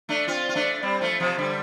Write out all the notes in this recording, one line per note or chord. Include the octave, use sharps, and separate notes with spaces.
A3 D4
C4 F4
F4
A3 D4
G3 C4
F3 A3
C3 F3
D3 G3